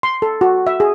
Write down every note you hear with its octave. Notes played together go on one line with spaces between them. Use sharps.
C6
A4
F#4
E5
G#4